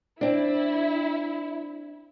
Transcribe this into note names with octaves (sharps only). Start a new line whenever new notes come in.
C4 D4 E4